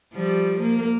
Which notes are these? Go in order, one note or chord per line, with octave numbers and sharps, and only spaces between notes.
F3 G3
A#3